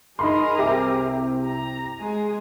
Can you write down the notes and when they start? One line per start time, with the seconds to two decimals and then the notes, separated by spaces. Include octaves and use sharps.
0.19 D#4 G#4 A#4 B5 C6
0.58 C2 C3 G4 E5 D6
1.45 A#5
1.99 G#3 G#4